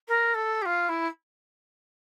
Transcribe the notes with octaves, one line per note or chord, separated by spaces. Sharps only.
A#4
A4
G4
F4
E4